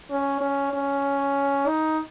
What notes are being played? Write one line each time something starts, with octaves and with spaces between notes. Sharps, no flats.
C#4
C#4
C#4
D#4